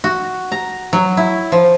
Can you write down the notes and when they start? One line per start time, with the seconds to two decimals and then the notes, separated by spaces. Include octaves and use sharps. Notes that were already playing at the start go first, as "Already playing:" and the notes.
0.04 F#4
0.52 A#5
0.93 F#3
1.17 E4
1.52 F3